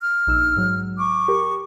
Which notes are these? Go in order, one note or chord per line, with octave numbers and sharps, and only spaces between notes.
F6
A#1 D#4 E6
G#2 F#3
C#6 D6
G4 A#4